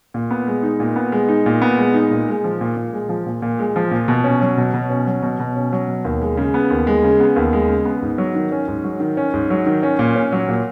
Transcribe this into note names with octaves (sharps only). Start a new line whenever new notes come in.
A#2
B3
G#3
D#4
A#2
B3
G#3
D#4
A#2
B3
G#3
D#4
A#2
G#3
F3
A#2
A#2
G#3
F3
A#2
A#2
G#3
F3
A#2
B2
C#4
F#3
B2
B2
C#4
F#3
B2
B2
C#4
F#3
B2
D#2
G#3
C#3
B3
D#2
G#3
C#3
B3
D#2
G#3
C#3
B3
G#2
F#3
D#3
C#4
G#2
F#3
D#3
C#4
G#2
F#3
D#3
C#4
A#2
C#4
F#3
A#2